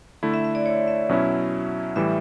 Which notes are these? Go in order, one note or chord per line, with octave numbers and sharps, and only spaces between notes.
D3 A3 E4
E5
E5
D5
C#5
E5
B2 F#3 C#4 E4
A2 E3 G3 E5